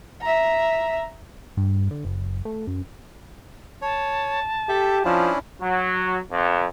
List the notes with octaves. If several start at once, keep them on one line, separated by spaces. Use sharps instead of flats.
E5 A#5
G2
D3
F#1
A3
F#2
C#5 A5
G4 A4 E5
F3 C#4 D4 E4
F#3
F2